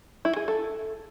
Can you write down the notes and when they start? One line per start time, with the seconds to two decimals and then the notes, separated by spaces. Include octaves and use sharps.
0.25 E4
0.36 G#4
0.48 A4